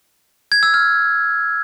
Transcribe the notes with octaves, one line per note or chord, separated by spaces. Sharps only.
G#6
E6
F6